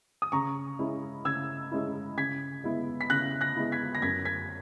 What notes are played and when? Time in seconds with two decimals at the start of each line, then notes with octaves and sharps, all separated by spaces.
0.22 D#6
0.32 C#3 A#5 C#6
0.79 G#3 C#4 E4
1.25 C#3 E6 G#6
1.71 G#3 C#4 E4
2.17 C#3 G#6 B6
2.64 G#3 B3 E4
3.01 B6
3.10 C#3 F#6 A#6
3.41 F#6 A#6
3.56 G#3 B3 E4
3.72 G#6 B6
3.95 A#6
4.02 F#2 G#6 B6
4.25 G#6 B6